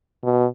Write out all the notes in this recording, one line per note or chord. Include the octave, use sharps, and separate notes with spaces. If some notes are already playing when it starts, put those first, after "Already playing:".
B2